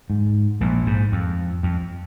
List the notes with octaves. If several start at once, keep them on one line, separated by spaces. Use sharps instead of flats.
G#2
A#1 A#2
G#2
F2
F2